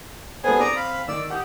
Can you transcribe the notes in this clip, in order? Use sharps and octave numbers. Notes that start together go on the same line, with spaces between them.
G3 B3 G#4 A4 C5 G#5
C4 D5 A#5 D#6
F5 B5
D#3 D5 E6
G4 F#5 D#6